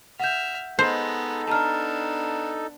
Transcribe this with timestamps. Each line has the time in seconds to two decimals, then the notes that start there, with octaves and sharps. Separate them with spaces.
0.20 E5 F#5 F6 G6
0.79 G#3 B3 D#4 A4 C5
1.47 B3 D4 A5 A#5 F6